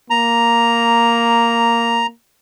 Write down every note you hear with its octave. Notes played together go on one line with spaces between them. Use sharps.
A#3 A#5